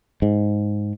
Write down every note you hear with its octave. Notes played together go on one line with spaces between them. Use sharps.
G#2